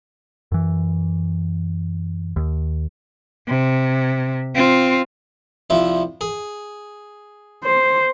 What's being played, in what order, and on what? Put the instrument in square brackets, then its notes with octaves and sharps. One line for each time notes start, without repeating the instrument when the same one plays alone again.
[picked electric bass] F#2 E3
D#2
[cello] C3
C4 F4
[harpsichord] C2 F3 E5
G#4
[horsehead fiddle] C5